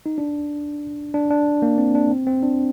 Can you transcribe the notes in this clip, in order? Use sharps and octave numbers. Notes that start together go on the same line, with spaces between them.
D#4
D4
D4
D4
A#3
C4
D4
C4
C4
D4